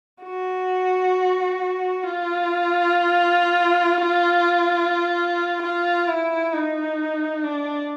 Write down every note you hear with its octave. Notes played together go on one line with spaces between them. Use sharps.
F#4
F4
F4
E4
D#4
D4